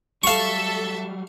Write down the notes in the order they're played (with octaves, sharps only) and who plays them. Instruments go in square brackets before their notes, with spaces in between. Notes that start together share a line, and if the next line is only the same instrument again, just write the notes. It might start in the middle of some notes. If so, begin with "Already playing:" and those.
[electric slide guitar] F#3 G3 [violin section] A4 E5 [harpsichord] F5 C#6